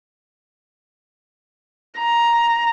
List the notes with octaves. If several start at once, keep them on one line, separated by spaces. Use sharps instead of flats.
A#5